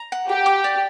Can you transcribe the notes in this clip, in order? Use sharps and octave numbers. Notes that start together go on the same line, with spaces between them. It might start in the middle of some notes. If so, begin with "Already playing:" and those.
Already playing: A#5
F#5
G4 A#5
D6
D5